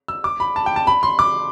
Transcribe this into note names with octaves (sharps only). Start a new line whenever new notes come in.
E6
D6
B5
A5
G5
A5
B5
C6
D6